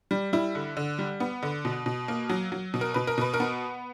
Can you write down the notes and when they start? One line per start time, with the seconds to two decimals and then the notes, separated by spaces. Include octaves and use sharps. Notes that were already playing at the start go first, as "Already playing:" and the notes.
0.11 G3
0.33 G3 E4
0.55 D3
0.77 D3
0.99 G3
1.20 B3
1.43 D3
1.65 B2
1.86 B2
2.08 A#3
2.29 F#3
2.52 F#3
2.74 B2
2.81 A#4
2.94 B2 B4
3.07 A#4
3.18 B2 B4
3.34 A#4
3.40 B3